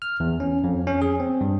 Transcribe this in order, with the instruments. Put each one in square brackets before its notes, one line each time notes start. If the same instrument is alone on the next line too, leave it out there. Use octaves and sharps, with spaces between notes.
[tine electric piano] F6
E2
C#4
F2
C#4
G#4
C4
G2